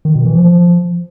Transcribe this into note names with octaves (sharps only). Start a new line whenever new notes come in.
D#3
B2
E3
F3